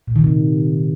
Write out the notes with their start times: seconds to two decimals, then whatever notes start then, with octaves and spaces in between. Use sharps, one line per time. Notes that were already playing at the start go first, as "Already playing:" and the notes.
0.08 A#2
0.16 D#3
0.24 C3